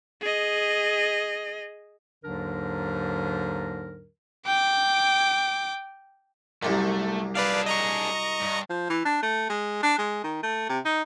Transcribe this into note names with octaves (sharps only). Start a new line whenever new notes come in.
G#4 D#5
D#2 G#2 D3 F#3 D4 A#4
G5 D6
C2 F#2 A#2 A3
D4 G#4 B4 D5 F5
D#5 A#5 C#6
G2
F3
E3
D4
A3
G#3
D4
G#3
D#3
A3
C3
D#4